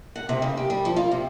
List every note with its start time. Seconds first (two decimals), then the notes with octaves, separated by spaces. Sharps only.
0.16 F#5
0.29 C3
0.42 C#3
0.57 G4
0.70 G3
0.85 F3
0.96 F4
1.11 C3